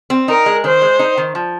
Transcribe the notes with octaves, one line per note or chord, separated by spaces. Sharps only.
C4
D#4 A#4
G#3
D#3 C5
G#3
D#4
D#3
F3